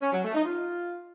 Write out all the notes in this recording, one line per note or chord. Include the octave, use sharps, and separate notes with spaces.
C#4
F#3
A3
D#4
F4